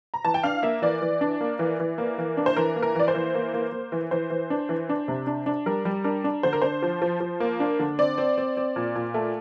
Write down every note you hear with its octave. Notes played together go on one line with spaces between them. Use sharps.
A#5
E3 A5
G5
D4 F5
A#3 E5
E3 D5
E3
D4
A#3
E3
E3
A#3
E3
D4
C5
E3 A#4
A#3
A#4
E3 D5
C5
E3
A#3
A#3
A#3
E3
E3 C5
E3
D4
E3
D4
C3
D4
D4
G3 A#4
G3
D4 A#4
D4
D3 C5
A#4
D4 C5
F3
F3
F3
A#3
D4
D3
C4 D5
C4
C4
C4
A#2
A#2
A3